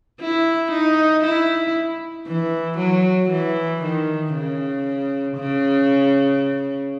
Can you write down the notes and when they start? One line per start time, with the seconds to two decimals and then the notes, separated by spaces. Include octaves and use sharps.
0.20 E4
0.72 D#4
1.24 E4
2.27 E3
2.78 F#3
3.31 E3
3.83 D#3
4.34 C#3
5.36 C#3